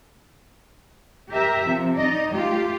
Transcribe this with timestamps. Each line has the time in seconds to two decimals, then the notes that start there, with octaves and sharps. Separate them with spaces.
1.30 G4 A#4 E5
1.66 C3 F3
1.98 D#4 D5 D#5
2.32 A3 F4 G4